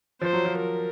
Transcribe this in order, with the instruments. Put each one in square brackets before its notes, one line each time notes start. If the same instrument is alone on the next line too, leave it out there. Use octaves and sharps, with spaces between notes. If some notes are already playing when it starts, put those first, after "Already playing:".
[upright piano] F3 [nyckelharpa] C5
[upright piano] F#3
F3
[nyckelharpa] A#4